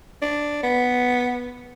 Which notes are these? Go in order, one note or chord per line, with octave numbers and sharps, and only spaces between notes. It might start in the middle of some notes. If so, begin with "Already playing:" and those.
D4
B3